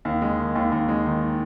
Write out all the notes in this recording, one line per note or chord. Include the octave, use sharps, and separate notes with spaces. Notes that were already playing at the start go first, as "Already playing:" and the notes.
D#2
G#3
D#3
D#2
D#2
G#3
D#3